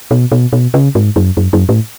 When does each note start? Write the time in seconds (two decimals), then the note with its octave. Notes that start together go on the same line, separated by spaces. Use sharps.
0.11 B2
0.32 B2
0.53 B2
0.74 C#3
0.95 G#2
1.16 F#2
1.37 F#2
1.53 F#2
1.69 A2